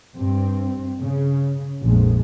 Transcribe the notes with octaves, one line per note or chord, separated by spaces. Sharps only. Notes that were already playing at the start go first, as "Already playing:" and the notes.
G2 C4
C#3
A#1 F2 G#3